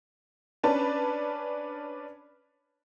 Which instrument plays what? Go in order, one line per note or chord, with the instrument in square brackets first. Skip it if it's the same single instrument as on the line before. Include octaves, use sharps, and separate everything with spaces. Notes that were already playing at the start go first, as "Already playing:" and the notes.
[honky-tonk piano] C#4 D4 B4 A5